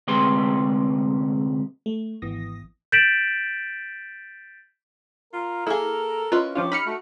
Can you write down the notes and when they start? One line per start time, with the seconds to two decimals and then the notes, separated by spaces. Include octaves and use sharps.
0.08 D2 C3 G#3 G4 B4 C6
1.86 A3
2.22 G#1 E3 B3 D#6 A#6
2.92 G6 A6 B6 D7 E7 F#7
5.33 F4 A#4
5.67 A#3 E4 G#4 A4
6.32 C#4 E4 F4 B4 D#5
6.55 F3 C#4 D4 F4 G4
6.72 D#4 B5 F6 C#7
6.86 A3 F#4